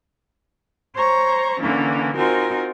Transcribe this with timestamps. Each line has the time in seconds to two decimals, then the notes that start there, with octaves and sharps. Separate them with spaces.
0.94 C5 C#5 A#5 C#6
1.60 D3 E3 A#3 C#4 D4
2.16 C4 D#4 F4 F#4 A#4 G#5